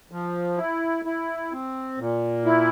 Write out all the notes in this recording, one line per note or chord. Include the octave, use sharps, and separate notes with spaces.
F3
E4
E4
C4
A#2
E4